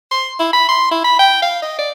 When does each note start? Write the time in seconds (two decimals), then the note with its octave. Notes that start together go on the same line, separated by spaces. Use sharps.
0.11 C6
0.39 E4
0.53 B5
0.68 C6
0.91 E4
1.04 B5
1.19 G5
1.42 F5
1.62 D#5
1.78 D5